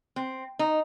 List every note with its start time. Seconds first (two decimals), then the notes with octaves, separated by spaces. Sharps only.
0.16 C4
0.59 D#4